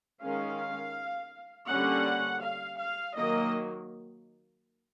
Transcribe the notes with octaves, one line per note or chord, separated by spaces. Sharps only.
D#3 G#3 C#4 F5
D3 G3 A#3 C#4 F#5
F5
F5
D#3 F#3 A#3 D#5